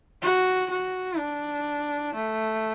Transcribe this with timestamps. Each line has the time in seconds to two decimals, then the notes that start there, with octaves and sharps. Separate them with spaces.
0.22 F#4
0.71 F#4
1.18 D4
2.14 A3